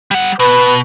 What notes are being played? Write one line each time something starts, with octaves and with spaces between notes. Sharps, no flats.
G3 F#5
B2 B4